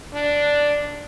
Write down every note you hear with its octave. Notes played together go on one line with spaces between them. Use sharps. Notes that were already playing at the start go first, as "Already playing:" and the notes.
D4